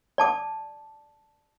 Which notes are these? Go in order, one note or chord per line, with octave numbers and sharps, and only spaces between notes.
D5 A5 D6